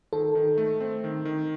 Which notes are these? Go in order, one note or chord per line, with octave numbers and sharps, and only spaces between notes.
D#3 A4
D#3
A3
C4
D#3
D#3